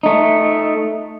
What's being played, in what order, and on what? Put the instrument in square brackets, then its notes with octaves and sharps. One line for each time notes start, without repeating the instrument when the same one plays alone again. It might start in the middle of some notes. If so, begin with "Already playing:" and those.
[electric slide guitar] A3 D#4